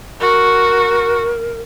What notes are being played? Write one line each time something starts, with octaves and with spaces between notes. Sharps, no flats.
F#4 A#4